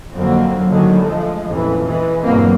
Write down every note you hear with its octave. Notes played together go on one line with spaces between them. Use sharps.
F2 D3 F#3 A#3 C4
A2 D3 D#3 F#3 G#3
F3 G#3 A3
A1 F2 A#2 E3
E3 G#3
E2 G2 B2 F#3 A#3 C4